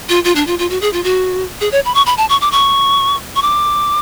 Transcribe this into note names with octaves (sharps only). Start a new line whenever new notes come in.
F4
F4
D4
F4
F4
F#4
G#4
F4
F#4
G#4
C#5
B5
C#6
B5
A5
C#6
D6
C#6
C#6
D6